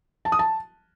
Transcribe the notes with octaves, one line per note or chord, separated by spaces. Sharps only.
A5
D#6
A5